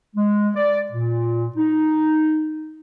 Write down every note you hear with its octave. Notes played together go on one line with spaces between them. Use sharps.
G#3
D5
A#2
D#4